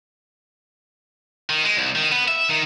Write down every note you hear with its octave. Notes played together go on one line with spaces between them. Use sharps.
D#3
G#3
C2
D#3
B3
E5
D#3